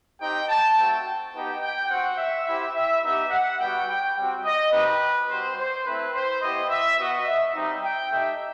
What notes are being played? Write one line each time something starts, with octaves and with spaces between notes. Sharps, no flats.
C4 D#4 G4 G5
A5
A3 C4 F#4 G5
B3 D#4 G4 G5
G5
C4 F#4 F#5
E5
C4 E4 G4 E5
E5
B3 D#4 G4 E5
F#5
G3 B3 F#4 G5
G5
G3 C4 F#4
D#5
C4 D#4 G4 B4
G3 C4 F#4 C5
C5
A3 C4 E4 B4
C5
B3 E4 G4 D#5
E5
B3 F#4 D#5
E5
G3 C4 D#4
G5
A3 D#4 G4 E5